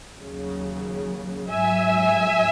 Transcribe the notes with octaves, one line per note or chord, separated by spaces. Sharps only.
D#2 C#3 F#3
G#2 F#3 E5 G#5